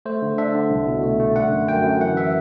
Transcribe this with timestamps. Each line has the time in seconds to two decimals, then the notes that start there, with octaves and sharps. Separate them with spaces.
0.06 A3 C5
0.22 D3
0.38 D4 E5
0.54 D3
0.70 C2
0.87 B2
1.03 A3
1.20 A3
1.36 D3 F#5
1.52 F#2
1.68 F#2 G5
1.85 F#2
2.01 E3 F#5
2.17 E5